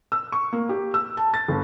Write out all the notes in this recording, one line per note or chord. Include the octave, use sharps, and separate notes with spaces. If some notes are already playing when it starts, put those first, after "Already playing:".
E6
C#6
A#3
G4
E6
A5
A6
G1